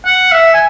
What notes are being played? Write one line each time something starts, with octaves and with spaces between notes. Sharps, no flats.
F#5
E5
G#5